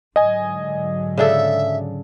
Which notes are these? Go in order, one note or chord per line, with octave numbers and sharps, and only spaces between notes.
G#2 D3 F#3 D#5 G#5
C#3 D4 A4 E5